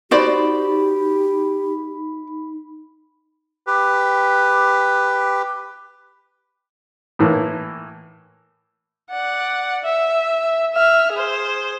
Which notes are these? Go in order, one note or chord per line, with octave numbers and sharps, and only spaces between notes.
D#4 F#4 G4 C5 D5 B5
G4 B4
A2 E3 A#3
D5 F#5
E5
E5 F6
G#4 C5